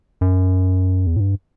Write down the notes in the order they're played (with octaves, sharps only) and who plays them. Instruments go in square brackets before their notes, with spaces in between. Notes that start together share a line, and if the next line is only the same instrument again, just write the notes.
[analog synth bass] F#2
E2
A2
G2